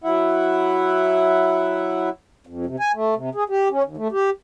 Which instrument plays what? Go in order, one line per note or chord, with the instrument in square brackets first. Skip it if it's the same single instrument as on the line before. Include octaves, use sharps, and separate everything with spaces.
[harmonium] F#3 E4 E5 F#5
F2
C3
G#5
A3
C3
G#4
G4
C#4
D#2
A3
G4